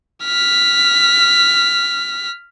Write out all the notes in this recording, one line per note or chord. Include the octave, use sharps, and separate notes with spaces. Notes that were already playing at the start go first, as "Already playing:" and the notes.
F6 B6